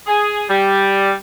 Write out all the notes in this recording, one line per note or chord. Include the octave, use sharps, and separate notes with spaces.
G#4
G3